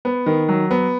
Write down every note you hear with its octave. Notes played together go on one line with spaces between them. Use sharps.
B3
D#3
F#3
B3